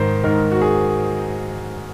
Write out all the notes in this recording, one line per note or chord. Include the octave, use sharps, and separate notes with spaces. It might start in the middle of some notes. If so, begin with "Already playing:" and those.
Already playing: G#2 D#3 C5
G#2 D#3 A#4
F#4
G#4